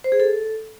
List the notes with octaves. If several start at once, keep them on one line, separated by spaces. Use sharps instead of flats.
C5
G#4
A4